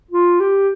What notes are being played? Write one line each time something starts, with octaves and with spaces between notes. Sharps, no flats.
F4
G4